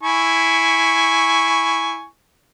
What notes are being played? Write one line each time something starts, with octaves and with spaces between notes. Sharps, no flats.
E4 G#5 C#6